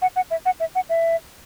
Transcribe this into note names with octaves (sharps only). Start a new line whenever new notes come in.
F#5
F#5
E5
F#5
E5
F#5
E5